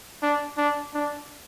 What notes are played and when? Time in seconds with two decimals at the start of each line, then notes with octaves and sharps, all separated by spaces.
0.23 D4
0.58 D4
0.94 D4